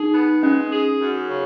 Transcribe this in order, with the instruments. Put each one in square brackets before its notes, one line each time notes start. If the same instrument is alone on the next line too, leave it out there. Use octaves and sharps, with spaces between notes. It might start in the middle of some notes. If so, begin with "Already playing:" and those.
Already playing: [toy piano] D#4 [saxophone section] G#4
[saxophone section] B3
[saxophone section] G#3 [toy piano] C#4
[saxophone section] G#4
F#2
C#3